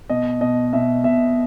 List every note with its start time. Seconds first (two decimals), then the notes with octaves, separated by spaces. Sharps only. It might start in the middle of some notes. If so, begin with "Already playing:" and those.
0.09 B2 D#5
0.41 B2 D#5
0.73 B2 E5
1.04 B2 E5